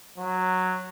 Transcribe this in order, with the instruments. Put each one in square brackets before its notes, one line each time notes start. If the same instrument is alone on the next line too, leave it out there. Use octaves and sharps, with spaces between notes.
[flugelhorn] F#3